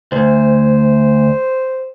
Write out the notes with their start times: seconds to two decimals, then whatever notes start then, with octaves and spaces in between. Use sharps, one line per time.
0.12 D2 C5